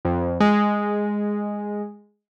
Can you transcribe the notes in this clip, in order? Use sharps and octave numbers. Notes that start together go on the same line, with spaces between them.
F2
G#3